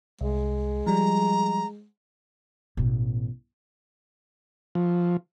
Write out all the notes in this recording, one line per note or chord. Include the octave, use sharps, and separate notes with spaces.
C2 G#3
F3 G3 A#5
A1 B2
F3